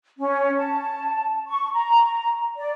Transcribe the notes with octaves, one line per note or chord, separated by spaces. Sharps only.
C#4
A5
C#6
A#5
D5